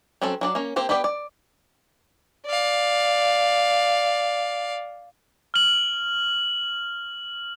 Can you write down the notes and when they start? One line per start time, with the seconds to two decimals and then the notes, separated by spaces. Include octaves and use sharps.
0.21 F#3 C4 C#4 F#4 A4
0.41 F#3 D4 D5
0.55 A#3 C#4
0.76 A#3 C4 G4 C5
0.89 B3 G4 B4 D5 G5
1.04 D5
2.46 D5 F5
5.54 F6 F#7